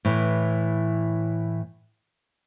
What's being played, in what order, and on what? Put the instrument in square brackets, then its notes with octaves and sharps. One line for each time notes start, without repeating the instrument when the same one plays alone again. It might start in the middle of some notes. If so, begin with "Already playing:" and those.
[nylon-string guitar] A2 E3